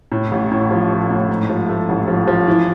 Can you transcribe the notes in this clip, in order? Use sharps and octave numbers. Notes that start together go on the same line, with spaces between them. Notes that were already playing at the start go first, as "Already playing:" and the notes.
A2
A1
A2
F3
A3
A2
G#2
F3
A3
A1
F3
F3
E3